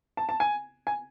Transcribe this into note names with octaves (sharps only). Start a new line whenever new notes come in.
A5
A5
G#5
G#5